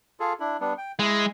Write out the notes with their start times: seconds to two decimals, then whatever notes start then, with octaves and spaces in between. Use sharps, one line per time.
0.20 F4 G#4 A4
0.40 D4 E4
0.61 G3 B3 D4
0.78 G5
0.99 G#3 E4